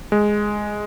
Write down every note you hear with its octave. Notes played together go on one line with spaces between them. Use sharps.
G#3